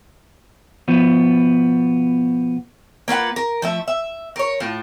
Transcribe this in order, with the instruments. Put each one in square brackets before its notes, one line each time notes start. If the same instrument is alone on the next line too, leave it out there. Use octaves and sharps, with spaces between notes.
[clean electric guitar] B2 F3 B3
[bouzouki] A#3 F4 B4 F#5
A#4
F3 A3 E5
E5
A#4 C#5
A2 F4 A5